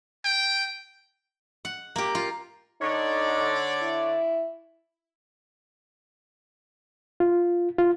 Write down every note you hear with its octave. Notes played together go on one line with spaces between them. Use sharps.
G5
F#5
A#3 G4
F4
D3 D#4 C#5 D5
E4
F4
F4